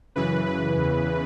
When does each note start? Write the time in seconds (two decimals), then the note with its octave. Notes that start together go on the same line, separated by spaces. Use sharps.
0.16 F#2 C#3 E3 B4
0.46 B4
0.77 E2 C#3 E3